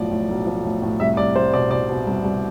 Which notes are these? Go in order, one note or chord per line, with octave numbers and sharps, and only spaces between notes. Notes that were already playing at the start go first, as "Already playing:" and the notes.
Already playing: B1 A2 F3 D5
A2
B1
F3
A2
A2
C2 E5
C2 D5
C2 C5
B2 D5
B2 D5
B2
C2
C2